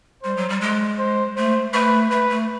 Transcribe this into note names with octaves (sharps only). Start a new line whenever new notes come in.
G3 C5
F#3
G3
G#3
C5
A3 C5
A3 B4
A3 B4
A3